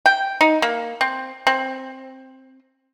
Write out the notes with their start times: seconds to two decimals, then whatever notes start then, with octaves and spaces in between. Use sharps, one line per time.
0.06 G5
0.41 D#4
0.62 A#3
1.01 C4
1.47 C4